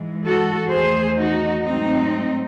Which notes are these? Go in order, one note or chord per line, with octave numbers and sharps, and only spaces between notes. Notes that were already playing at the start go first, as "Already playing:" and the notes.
Already playing: G#2 E3 G#3
F#4 A4
E2 D#3 A3 G#4 C5
D#4 F#4
G#2 F#3 A3 C4 D#4